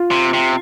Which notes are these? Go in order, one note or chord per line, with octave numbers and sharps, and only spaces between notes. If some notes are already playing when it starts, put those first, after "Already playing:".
Already playing: F4
C3
C3